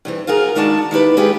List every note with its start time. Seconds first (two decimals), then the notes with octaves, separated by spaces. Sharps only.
0.05 G2 E3 C4
0.27 F4 F#4 G#4 A#4
0.55 D#3 G#3 D4 F#4 F#5 A5
0.91 D#3 E4 G4 B4
1.17 G#3 F4 G4 G#4 B4 G5